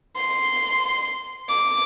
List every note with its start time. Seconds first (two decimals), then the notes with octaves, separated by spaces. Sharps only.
0.16 C6
1.49 D6